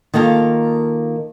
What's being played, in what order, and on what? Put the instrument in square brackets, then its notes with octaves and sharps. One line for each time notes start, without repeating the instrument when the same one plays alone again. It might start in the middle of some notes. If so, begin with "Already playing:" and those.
[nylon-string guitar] D#3 A#3 F4 A4 F5